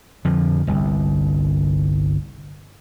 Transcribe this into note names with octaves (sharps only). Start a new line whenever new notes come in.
F2 D3 F3
G1 C2